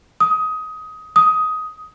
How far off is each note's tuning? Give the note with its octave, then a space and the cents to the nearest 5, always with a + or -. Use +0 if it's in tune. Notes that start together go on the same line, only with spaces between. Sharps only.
D#6 +20
D#6 +15